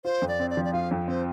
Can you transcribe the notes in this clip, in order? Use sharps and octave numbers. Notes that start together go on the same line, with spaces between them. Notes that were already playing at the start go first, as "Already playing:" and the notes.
F4 C5
F2
D5
C4
D5
F3
D5
F4 F5
F2
C4 C5